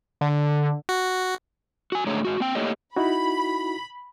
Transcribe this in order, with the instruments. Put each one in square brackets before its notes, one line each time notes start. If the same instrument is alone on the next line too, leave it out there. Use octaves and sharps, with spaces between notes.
[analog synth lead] D3
[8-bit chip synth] F#4
[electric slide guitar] F#4 G#5
G#2 D3 A3 G#4 C#5 A#5
G#2 F#4
A#3 C4 G5
A3 A#3 G4 C#5 D#5
[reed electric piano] D#4 E4 F#4 [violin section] B5